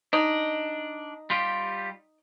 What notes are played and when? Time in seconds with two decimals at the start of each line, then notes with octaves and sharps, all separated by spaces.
0.13 D4 D#4
1.30 G3 F4 G4